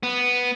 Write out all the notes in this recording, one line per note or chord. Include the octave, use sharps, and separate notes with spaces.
B3